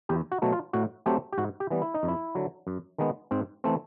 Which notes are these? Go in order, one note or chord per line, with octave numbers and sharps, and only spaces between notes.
E2 G4
F#4
B2 F#3 A3
F4
A2 F#4
F#3 A3 C4 G4
G4
G#2 F#4
G4
E3 G3 B3
E4
D#4
F2
E4
D3 F#3
F#2
D#3 G#3 B3
G#2 C4
E3 A3 C4